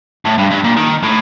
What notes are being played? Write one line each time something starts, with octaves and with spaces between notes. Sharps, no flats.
A2
G2
G2
A#2
D#3
A2